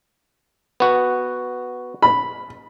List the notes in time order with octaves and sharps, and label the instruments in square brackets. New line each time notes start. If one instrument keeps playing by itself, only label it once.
[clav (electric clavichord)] B3 F#4
[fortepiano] B5